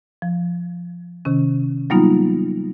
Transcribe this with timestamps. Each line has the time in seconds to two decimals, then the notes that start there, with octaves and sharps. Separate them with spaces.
0.22 F3
1.25 C3 D#3 C#4
1.90 F#3 G3 A#3 B3 D#4 F4